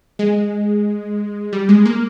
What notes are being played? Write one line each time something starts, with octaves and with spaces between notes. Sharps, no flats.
G#3
G3
G#3
A#3